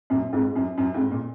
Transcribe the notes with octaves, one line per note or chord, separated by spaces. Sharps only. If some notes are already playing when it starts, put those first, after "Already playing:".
F#2 A#2
F2 G#2
F#2
F#2
F2 G#2
A#2